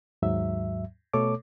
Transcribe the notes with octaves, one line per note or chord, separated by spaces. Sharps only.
D#2 G#2 F#3 E5
B2 A3 A4 C#5 D6